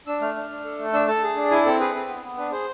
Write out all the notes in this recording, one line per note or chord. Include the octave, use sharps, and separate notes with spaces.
D4 E6
A3 F6
D4
D4
A4
A3
D4 E6
A4 A5
G#4
D4
E4 G#5
C4 A4
G#4 B4
C4
B3
B3
D4 B4
G#4 C5